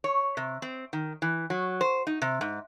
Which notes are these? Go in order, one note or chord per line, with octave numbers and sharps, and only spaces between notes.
C#5
C3
C4
D#3
E3
F#3
C5
D#4
C3
G#2